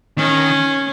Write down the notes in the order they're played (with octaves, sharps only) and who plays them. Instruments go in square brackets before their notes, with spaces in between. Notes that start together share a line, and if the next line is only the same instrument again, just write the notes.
[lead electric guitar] D#3 [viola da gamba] C#4